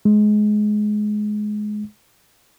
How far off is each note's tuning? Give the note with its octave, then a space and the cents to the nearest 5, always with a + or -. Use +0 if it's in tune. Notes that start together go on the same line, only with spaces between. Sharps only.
G#3 +20